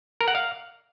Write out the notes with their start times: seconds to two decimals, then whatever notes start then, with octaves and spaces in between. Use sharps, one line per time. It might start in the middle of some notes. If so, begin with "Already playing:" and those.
0.21 A#4
0.28 F#5
0.35 F5